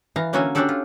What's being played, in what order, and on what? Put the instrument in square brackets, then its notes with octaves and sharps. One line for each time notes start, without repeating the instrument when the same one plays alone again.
[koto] E3 F5 A#5
D3 A#3 C#4 F#4 A4 G#5
C#4 D4 F#4 G4 A4 D5
F4